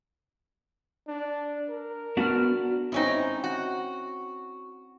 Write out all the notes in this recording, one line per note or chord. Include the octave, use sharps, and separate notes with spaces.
D4
A#4
B3 D4 F#4 F6
G#2 C4 C#4 D#4 E4
F#4